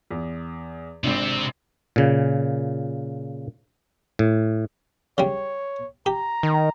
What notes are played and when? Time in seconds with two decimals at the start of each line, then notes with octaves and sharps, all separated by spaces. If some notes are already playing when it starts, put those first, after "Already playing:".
0.11 E2
1.04 G#1 C3 C4 D4
1.96 A#2 C#3
4.19 A2
5.18 C#3 G3 C#5
6.06 G4 A#5
6.43 D#3